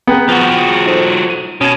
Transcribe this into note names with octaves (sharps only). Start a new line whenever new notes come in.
B3 G#4 G5 A#5
F3 F#4
D#4 A4 C5
D#7
B2 C#4 G#6